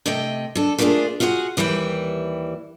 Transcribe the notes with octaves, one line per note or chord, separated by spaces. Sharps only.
C3 A3 D#5 G5
D3 A4
A3 A#3 D4 D#4 F4 G#4
F4 F#4 G#4 C5 F#5
D#2 E3 G3 E4 G5